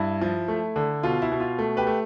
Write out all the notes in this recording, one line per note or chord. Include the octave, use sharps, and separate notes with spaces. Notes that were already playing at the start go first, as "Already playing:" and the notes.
Already playing: G2 E4
F3
A3
D3
B2 F4
E4
B2
F4
A3
G4 B4
A3